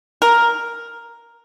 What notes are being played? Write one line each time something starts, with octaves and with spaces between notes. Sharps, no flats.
A#4